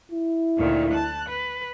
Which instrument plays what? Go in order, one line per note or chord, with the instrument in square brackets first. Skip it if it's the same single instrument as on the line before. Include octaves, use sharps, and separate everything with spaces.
[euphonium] E4
[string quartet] D2 A#2 D#3
A5 F#6
B4